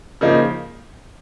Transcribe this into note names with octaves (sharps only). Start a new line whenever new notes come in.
C#3 F3 A#3 D#4